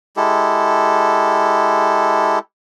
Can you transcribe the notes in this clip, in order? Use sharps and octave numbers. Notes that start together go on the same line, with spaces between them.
G#3 E4 G4 A4